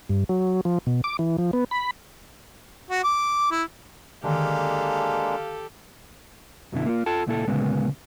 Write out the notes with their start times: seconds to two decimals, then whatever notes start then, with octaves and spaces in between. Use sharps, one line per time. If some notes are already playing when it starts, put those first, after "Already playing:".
0.10 G2
0.29 F#3
0.65 F3
0.87 B2
1.04 D6
1.19 E3
1.38 F3
1.53 B3
1.71 B5
2.91 F#4
3.04 D6
3.51 E4
4.24 D3 D#3 G#3 A#3 D4 G4 A4 F5
6.72 B1 F#2 B2 D3 E4
6.86 A#3 F4
7.06 F4 A4 A5
7.26 C#2 A#2 E4 A4
7.47 D2 A#2 C#3 G#3 A#3 B3